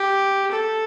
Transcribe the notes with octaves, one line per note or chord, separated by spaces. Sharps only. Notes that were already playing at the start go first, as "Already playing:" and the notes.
Already playing: G4
A4